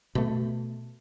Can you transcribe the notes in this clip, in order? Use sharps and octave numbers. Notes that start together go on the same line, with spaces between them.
B2 A3